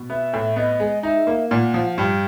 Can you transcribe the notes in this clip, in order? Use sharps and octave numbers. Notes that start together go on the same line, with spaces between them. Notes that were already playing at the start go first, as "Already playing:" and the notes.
Already playing: B2
B3 E5
A2
B3 D#5
G#3
D#4 E5
A#3
A#2 F#5
F3
G2 G5